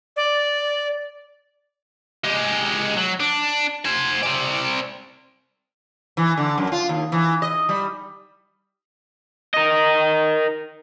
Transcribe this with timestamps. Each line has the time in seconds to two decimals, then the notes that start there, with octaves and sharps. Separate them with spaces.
0.16 D5
2.24 G#3 G4
2.97 F#3
3.20 D4
3.85 C5 G#5
4.23 C4 D5
6.17 E3
6.37 D3
6.58 F#2
6.72 F4
6.89 D#2
7.12 E3
7.42 D#5
7.69 G3
9.54 A#4 D#5